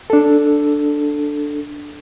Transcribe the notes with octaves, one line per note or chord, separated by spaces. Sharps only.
D4 A4